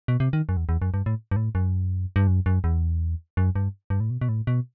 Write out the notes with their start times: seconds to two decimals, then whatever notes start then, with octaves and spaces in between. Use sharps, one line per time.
0.08 B2
0.20 C3
0.33 D#3
0.49 F#2
0.57 E2
0.69 E2
0.82 F#2
0.94 G2
1.06 A2
1.31 G2
1.36 A2
1.55 F#2
2.16 G2
2.27 F#2
2.46 F#2
2.64 E2
3.37 F#2
3.56 G2
3.90 G2
4.00 A2
4.10 B2
4.21 B2
4.29 A2
4.47 B2